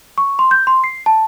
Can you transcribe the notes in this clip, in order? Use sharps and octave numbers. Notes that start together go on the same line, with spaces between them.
C#6
C6
G6
C6
C7
A5